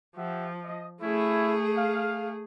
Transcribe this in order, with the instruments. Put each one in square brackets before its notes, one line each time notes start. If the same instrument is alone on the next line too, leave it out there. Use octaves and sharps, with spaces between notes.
[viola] F3 [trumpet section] G4 E5 F#5
[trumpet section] D#5
[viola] A3 G#4 [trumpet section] C#4 E4
[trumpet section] F5